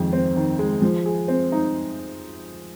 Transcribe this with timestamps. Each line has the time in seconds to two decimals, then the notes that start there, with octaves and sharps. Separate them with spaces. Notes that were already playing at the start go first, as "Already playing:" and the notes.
Already playing: F2 D#3 G#3
0.13 C4
0.36 D#3
0.59 G#3
0.82 F3
1.06 G#4
1.28 C4
1.52 D#4